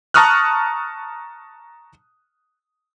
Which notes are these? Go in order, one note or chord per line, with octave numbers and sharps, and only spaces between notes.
A5 A#5 C#6 D#6 F6 F#6